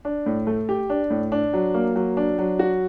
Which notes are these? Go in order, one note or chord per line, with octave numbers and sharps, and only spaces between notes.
D4
A2
A3
G4
D4
A2
D4
F#3
A#3
F#3
D4
F#3
F#4